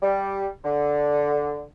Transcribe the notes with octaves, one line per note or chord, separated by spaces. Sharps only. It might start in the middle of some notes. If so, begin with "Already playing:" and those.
G3
D3